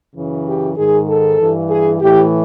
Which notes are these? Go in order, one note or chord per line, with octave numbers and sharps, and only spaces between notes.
F#2 C#3 E3
G4
G#2 D#3 G#4
A4
G2 E3
G#4
A2 E3 G4